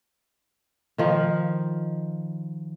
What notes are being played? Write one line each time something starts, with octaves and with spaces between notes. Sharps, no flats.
D#3 F3